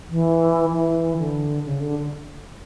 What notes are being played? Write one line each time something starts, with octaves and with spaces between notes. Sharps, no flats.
E3
E3
D3
C#3
D3